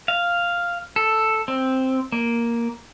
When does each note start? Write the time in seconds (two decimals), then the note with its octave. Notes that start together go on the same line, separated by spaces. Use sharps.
0.08 F5
0.96 A4
1.48 C4
2.12 A#3